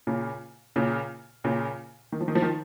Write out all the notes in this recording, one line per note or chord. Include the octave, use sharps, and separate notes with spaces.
A#2 C#3
A#2 C#3
A#2 C#3
D#3
F3
D#3
F3
D#3